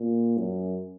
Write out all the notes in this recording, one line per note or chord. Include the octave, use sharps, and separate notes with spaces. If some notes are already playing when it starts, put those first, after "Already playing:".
Already playing: A#2
F#2